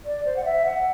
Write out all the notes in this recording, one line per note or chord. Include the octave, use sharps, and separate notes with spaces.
D5
C5
F#5
E5
F#5